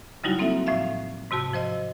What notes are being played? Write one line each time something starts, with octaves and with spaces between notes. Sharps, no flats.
C#3 F#3 G3 D#4 E4 F#4
A#3 C4 D#4 A4 E5
A2 F3 E5 F5
G#2 C3 F#4 A5
F3 C5 D#5